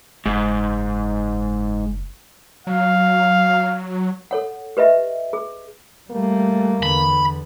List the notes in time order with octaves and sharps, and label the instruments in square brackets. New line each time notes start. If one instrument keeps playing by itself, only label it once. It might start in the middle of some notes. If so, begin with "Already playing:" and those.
[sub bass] F#1 [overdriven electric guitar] G#2
[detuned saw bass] F#3 [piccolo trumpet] F5
[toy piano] A4 C#5 F#5
G4 B4 D#5 E5
G#4
[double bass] G3 A3 [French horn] A#3
[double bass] E2 D3 [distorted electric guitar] B5